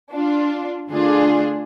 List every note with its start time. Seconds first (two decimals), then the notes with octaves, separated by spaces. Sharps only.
0.12 D4 F4
0.90 D3 A3 D4 F4 G#4